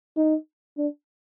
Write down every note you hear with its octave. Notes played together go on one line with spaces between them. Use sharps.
D#4
D4